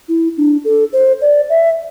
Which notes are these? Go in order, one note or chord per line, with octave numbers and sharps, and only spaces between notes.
E4
D4
A4
C5
D5
E5